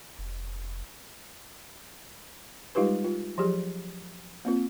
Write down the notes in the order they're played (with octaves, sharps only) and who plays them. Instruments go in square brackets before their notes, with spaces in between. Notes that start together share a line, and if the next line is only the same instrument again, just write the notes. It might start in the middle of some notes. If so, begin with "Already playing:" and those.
[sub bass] F1
[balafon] G3 G#3 D#4 F4 G4 B4
F4
F3 F#3 G4 G#4
A#3 C4 F4